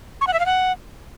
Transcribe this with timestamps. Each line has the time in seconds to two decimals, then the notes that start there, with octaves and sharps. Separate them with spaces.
0.21 C#6
0.27 F#5
0.33 E5
0.40 F5
0.46 F#5